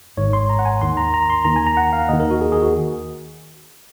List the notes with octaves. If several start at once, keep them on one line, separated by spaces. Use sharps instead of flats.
G#1 G#2 D#3 C#5
C6
A#5
F#5
G#5
D#2 D#3 C6
A#5
A#5
C6
D#2 D#3 A#5
G#5
A#5
F#5
F5
D#2 D#3 D#5
A#4
F#4
G#4
G#4
F#4